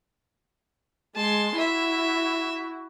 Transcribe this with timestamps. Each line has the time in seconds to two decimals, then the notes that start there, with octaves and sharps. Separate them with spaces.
1.16 G#3 A5 C6
1.57 E4 F#4 E5